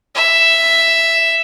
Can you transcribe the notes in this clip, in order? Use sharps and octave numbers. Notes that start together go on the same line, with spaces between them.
E5